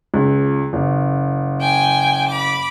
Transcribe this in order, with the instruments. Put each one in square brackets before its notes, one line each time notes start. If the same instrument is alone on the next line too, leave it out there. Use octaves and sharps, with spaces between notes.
[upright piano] C#2
F#1
[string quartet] G5 G#5
B5 D6